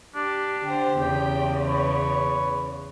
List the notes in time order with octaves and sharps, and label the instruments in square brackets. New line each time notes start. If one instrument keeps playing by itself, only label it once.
[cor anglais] D4 [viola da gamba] G4
[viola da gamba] D3 C5 [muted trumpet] G4
[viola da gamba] E2 C#3 [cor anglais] G5
[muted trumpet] B4 [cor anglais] C#5